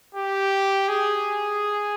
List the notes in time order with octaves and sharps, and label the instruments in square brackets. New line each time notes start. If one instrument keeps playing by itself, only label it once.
[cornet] G4
G#4